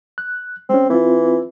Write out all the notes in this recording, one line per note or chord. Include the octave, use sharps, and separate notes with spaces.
F#6
G#3 C4 C#4
E3 C4 F4